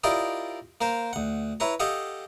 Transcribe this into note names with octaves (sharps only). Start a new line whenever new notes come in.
E4 F4 G4 A#4 D5 D#5
A#3 A#4 C5
D2 F#5
E4 B4 C#5 A#5
G4 A4 D#5 F5 F#5